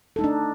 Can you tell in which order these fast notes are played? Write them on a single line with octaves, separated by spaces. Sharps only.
A4 D#4 A3 D4